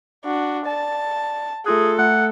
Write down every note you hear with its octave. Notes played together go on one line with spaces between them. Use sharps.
D4 F#4
D5 A5
A3 F4 G#4 A4 F#6
A3 F#5